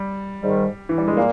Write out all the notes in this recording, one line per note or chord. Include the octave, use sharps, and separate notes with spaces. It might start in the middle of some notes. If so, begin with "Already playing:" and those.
Already playing: G3
G#2 D#3 G3
E3
G3
G#3
A#2 A#3